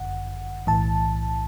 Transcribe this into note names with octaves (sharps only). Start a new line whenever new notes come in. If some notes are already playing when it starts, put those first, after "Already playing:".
Already playing: G1 F#2 D3 F#5
B1 A2 E3 A5